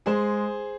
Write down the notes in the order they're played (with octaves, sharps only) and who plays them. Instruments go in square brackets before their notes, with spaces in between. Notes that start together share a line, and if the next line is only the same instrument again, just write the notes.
[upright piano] G#3 [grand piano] G#4 C5